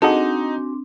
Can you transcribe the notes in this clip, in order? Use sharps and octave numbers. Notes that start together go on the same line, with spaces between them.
C4 D4 D#4 F#4 G#4 A4 D#5 F#5